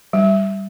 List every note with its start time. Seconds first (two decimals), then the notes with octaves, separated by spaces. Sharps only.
0.13 G3